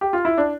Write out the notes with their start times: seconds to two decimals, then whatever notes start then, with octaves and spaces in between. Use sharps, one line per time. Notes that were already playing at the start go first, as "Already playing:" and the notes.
0.01 G4
0.13 F4
0.25 E4
0.38 D4